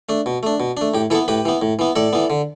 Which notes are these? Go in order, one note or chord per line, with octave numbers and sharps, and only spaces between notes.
A3 D4
B2
A3 D4
B2
A3 D4
A2 G4
E3 B3 E4 A4
A2 G4 B4
E3 B3
A2
E3 B3
A2 A4 D5
E3 B3
D3